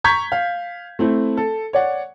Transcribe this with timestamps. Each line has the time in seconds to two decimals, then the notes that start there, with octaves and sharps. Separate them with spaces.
0.04 A#5 C#6 G6 G#6 B6
0.32 F5
0.99 A3 C4 E4
1.37 A4
1.73 C#5 D5 F#5